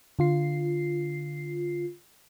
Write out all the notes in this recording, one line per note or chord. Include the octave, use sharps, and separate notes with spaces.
D3 F4 C7